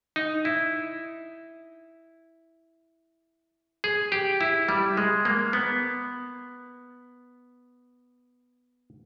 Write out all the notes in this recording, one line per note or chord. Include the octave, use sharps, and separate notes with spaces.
D#4
E4
G#4
G4
E4
G3
G#3
A#3
B3